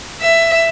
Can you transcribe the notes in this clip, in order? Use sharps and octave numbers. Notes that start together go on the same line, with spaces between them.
E5